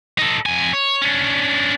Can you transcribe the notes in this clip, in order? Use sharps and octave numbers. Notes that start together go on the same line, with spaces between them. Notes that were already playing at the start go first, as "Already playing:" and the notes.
D#4 A4
F2 G#5
C#5
C#4 D4